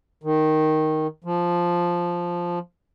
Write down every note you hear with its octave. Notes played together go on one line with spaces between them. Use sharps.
D#3
F3